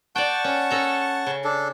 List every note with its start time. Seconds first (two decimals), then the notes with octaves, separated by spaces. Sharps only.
0.16 D5 F#5 G5 A5 C#6
0.44 C#4
0.71 C#4 A4 A#5
1.27 C#3
1.44 D4 A4